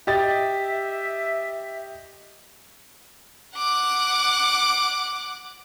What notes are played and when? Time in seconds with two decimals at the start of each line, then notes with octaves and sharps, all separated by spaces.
0.07 G4 D#5 E5 A6
3.56 F#5 D6